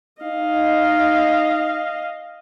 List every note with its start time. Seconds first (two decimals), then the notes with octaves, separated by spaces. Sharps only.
0.22 D#4 D#5 F5